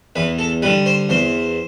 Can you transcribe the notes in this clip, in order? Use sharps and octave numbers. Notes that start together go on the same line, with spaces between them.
E2 B4
A4
D3 G3 B4
C5
E2 C5